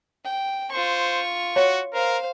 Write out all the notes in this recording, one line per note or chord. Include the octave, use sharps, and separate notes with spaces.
G5
F4 C5 C#6
F#4 C#5
A#4 C5 F5